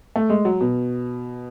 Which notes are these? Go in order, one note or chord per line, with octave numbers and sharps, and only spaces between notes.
A3
G#3
F#3
B2